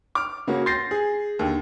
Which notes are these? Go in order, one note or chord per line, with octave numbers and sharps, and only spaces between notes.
D6 F6
C#3 A#3 C#4 F#4
C6 G6 A6 A#6 C7
G#4
D#2 D3